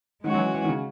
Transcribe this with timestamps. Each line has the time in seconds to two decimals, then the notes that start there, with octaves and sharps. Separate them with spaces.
0.24 D#3 G#3 C#4 F#4 C#5
0.34 F#3
0.38 E3
0.54 E3
0.65 D#3
0.69 C#3